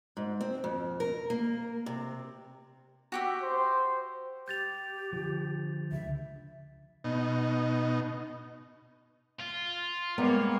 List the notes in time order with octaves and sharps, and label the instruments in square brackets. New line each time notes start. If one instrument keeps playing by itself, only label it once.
[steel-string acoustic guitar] G#2
C4
F2
A#4
A#3
C3
[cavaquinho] F#4 G4 E5
[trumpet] C5
[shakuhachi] G4 [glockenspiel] G6 A6 F7
[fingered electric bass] D3 F3
[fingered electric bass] C#2 D3 [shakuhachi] E5
[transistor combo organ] B2 D#4
[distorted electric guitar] F4
[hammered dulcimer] G3 A#4 D#5 [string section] G#3 A#3 C#5 [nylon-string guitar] B3